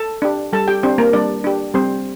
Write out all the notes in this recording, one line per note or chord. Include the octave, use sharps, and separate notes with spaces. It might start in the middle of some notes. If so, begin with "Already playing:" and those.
Already playing: A4 A5
D4 G4
G3 A4 A5
G4 G5
C4 D4 G4 C5
A#3 A#4
G3 D4 D5
D4 G4
G3 C4 C5